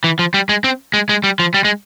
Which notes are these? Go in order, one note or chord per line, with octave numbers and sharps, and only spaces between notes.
E3
F3
G3
G#3
C4
G#3
G#3
G3
F3
G3
G#3